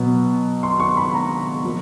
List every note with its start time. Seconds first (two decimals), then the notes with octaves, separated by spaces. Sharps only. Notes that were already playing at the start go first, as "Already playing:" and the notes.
Already playing: B2 F#3 B3
0.63 C6
0.80 C#6
0.97 B5
1.14 A#5
1.64 F3 A#3